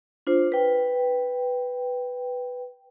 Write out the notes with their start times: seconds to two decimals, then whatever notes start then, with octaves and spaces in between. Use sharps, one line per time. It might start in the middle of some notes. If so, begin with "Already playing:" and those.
0.27 D4 F4 C5
0.52 B4 G5